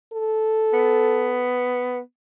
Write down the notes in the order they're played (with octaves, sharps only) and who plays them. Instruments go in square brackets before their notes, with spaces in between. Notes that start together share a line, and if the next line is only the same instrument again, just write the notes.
[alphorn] A4
[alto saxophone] B3